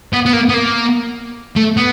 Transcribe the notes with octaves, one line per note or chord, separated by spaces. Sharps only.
B3
B3
A#3
B3
A#3
A3
B3